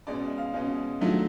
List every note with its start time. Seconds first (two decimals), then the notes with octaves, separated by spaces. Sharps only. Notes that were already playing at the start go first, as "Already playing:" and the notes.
0.07 B2 G#3 C#4 D5
0.26 E5
0.38 F5
0.54 B2 G#3 C#4 F5
1.01 D#3 F#3 A3 D4 F4 E5